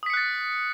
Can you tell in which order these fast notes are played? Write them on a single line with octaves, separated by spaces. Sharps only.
D#6 B6 C#7 F#6 A6